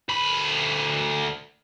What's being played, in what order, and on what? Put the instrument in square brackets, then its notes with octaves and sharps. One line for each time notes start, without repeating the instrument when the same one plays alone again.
[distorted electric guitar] D2 B5